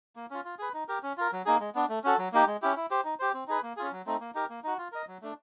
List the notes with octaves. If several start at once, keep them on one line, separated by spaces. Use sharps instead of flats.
A#3
C#4 F4
F4
G#4 B4
D#4
G4 A#4
C#4
F4 A#4
F#3
A#3 D#4 G#4
G#3
B3 D4
A3
C#4 F#4 A4
F#3
A#3 D#4 G4
G#3
C#4 E4 G4
E4
G4 C5
D#4
G4 C5
C4
D#4 G#4 B4
A#3
C#4 F4 G#4
F#3
A3 C4 D#4
A#3
D#4 G4 A#4
A#3
D#4 F#4
F4
A#4 D#5
F#3
A3 D4